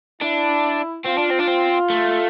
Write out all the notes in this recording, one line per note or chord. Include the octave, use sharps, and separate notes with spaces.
D4 E4
C4 F4
D4
C4
D4
C4
A3